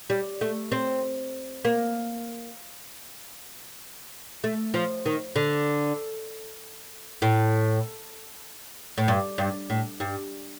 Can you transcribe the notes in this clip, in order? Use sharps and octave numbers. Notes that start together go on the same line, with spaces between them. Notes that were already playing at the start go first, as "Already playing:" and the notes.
G3
A3
C4
A#3
A3
F3
D#3
D3
A2
A2
G2
G2
A2
G2